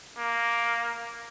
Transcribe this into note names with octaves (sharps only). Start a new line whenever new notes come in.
A#3